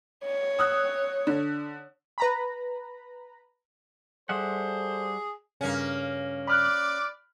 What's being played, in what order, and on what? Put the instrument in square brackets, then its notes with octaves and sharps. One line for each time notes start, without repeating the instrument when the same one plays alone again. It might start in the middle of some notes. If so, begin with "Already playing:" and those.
[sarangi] C#5
[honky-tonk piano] D#6 E6 F#6
D3
[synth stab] B4 A#5 B5
[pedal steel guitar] G3 E5 F#5 [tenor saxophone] G#4 [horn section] A4 C5
[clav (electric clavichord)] G2 C#3 [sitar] A#3 C#4
[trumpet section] D5 D6 [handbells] B5 F6 F#6